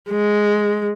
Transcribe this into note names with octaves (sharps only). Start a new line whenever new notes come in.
G#3